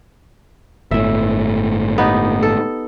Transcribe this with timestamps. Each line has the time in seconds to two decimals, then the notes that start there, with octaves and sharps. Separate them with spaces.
0.91 G1 A2 E5
1.98 B3 D#4 G4
2.43 A4